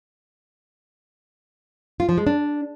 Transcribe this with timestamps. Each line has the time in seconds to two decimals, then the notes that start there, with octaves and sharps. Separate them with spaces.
2.00 F4
2.09 F3
2.18 G#3
2.27 D4